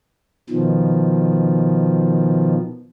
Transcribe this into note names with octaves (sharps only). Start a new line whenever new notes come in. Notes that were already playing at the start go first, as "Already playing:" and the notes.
B2 D#3 F3